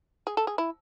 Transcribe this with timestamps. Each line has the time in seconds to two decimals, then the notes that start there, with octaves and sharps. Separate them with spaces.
0.27 G#4
0.37 A4
0.47 G#4
0.58 E4